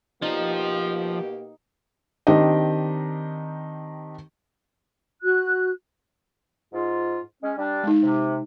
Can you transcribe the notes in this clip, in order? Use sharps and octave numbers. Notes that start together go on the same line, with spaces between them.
B2 F3 A#3 D#4 G4
D#3 C4 D4 D#4 G4 D#5
F#4 F#6
G#2 F4
G#3 C#4
G3 D4
G#3 D#4
C3